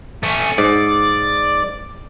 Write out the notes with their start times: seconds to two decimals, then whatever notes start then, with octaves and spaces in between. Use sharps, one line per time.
0.23 A3 C#4
0.58 G#2 D5